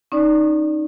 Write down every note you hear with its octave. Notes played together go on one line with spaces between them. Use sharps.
C#4 D#4 D5